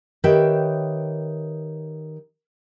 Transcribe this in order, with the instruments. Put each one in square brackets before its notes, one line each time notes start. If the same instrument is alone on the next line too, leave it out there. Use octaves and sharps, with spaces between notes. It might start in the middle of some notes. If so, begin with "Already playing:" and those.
[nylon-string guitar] D#3 G4 B4 C#5 E5 G5